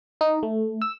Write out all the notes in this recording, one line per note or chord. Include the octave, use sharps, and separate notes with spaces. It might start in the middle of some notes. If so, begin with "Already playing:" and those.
D#4
A3
E6